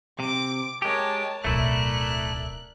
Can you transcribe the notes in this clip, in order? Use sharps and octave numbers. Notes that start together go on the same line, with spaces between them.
C3 D6 D7
G#3 G4 A#4 C#5 A5
D1 B1 A3 E4 A#4 D5 F#6